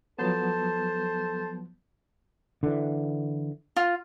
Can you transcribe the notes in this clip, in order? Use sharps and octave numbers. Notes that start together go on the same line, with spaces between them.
F3 F#3 B3 A4 C5 A5
D3 E3
F4